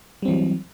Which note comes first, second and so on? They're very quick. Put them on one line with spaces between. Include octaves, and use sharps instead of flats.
G3 C4 E3 F#3